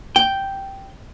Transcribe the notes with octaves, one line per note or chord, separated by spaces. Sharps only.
G5